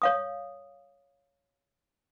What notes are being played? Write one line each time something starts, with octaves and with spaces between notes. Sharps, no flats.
C#5 F5 D#6